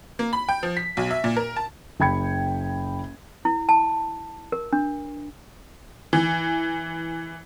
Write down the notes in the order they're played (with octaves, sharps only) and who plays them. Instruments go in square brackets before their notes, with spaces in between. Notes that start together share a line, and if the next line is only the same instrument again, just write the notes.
[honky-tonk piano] A#3
B5
G5
F3
B6
B1
E5
A#2
A#4
A5
[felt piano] F#1 G5 B5 G#6 C#7
[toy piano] E4
A5
A#4
D4
[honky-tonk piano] E3